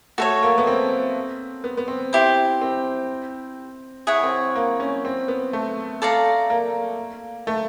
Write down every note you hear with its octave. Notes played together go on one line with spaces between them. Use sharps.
A3 F#4 A4 C#5
A#3
B3
C4
B3
B3
C4
E4 G4 C5
C4
E4 G#4 C#5 F#5
C4
A#3
C#4
C4
B3
A3
A4 D5 F5 A#5
A#3
A3